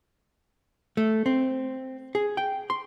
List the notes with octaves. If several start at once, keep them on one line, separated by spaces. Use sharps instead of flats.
A3
C4
G#4
G5
C6